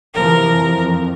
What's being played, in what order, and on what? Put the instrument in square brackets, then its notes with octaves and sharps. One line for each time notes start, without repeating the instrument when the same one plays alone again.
[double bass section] C3 E3 F3 [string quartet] A#4
[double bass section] F2